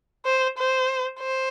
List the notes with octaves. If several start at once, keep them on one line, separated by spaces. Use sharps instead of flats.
C5
C5
C5